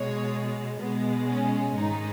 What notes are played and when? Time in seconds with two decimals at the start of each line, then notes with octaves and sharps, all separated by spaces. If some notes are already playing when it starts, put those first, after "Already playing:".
Already playing: B2 G#3 C#5
0.80 B2 G#3 B3
1.28 C#4
1.75 G#2 D#3 G#3 D#4